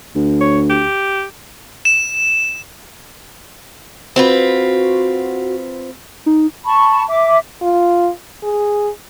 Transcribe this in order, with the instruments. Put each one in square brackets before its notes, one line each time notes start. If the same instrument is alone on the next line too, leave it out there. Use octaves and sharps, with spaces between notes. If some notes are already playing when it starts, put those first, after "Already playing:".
[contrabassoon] D2
[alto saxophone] C#5
G4
[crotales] E7
[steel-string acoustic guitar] C4 F4 B4 [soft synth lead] F#4
[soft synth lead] D#4
[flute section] A5 B5 C#6
E5 D6
[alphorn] F4
G#4